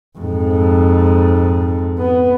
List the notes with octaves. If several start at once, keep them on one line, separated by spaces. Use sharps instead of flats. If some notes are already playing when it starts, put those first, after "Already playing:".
F2 G#2
B3